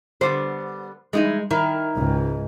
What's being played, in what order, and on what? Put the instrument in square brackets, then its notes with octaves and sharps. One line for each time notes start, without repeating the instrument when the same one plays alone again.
[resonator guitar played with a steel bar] D3 G3 B3 [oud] C5
[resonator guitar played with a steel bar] E3 D#4 E4 [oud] G#3
[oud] D#3 [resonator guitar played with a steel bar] E4
[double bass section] C#2 G#2